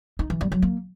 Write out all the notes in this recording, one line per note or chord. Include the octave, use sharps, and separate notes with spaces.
D#4
E3
G3
F#3
A#3